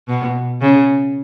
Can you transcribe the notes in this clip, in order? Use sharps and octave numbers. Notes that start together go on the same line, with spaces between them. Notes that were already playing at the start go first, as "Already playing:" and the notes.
B2
C#3